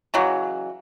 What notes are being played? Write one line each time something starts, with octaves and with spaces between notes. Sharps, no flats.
C#3 E3 F#3 G#3